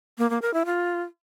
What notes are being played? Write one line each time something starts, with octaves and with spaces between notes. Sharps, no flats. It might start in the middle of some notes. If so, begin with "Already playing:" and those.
A#3
A#3
A#4
E4
F4